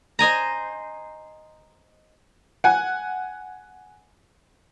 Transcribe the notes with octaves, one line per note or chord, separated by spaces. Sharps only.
C5 D#5 G#5 A#5
F#5 G#5